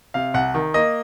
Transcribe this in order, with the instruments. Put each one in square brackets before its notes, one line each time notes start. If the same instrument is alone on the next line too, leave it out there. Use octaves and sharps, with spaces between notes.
[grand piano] C3 F5
C2 F#5
D#3
A#3 D#5